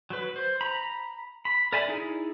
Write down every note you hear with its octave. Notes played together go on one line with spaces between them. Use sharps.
F#3 B4
C5
A#5 B5
B5
A#4 D5 E5 G#5 B5
D#4 E4 G#4